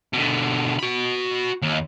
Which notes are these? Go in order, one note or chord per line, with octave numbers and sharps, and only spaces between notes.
B2 D3
F#4 B5
D#2